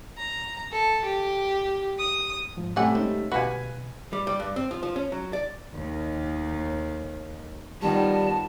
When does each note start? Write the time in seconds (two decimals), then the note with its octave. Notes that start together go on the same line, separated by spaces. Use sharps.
0.18 A#5
0.72 A4
1.05 G4
1.99 D#6
2.57 G#2 F3
2.76 A2 C3 G3 A3 C#4 G4 F#5 G#5
2.95 G#3 C4 C#4 D#4
3.32 D2 B2 G3 F#4 B4 F5 G#5
4.13 G3
4.27 G3
4.40 G2
4.56 C4
4.71 F3
4.83 F3
4.96 C#4
5.12 F#3
5.33 D5
5.73 D#2 D#3
7.82 D#3 F3 G3 B3 A5